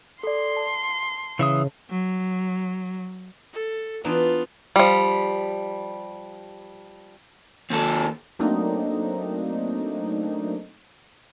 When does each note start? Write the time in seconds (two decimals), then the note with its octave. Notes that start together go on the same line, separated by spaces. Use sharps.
0.23 A4 D5 C6
0.56 A5
1.39 C#3 E3 E5 D#6
1.90 F#3
3.54 A4
4.04 E3 B3 D4 D#4 F4
4.76 F3 G3
7.70 D#2 A4
8.39 F#3 A3 A#3 C4 D4 D#4